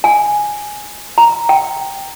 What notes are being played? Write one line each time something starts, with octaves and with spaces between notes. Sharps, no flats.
G#5
A#5
G5